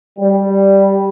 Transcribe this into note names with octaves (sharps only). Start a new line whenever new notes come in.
G3